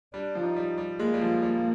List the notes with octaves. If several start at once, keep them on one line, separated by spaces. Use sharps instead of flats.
G3 D4
F3
D#4
G3
G3
G#3 A#3
G3
F3
G3